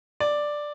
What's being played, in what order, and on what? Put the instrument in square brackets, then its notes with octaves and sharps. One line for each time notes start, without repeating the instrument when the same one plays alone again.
[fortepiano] D5